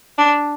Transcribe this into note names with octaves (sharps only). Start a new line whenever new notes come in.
D4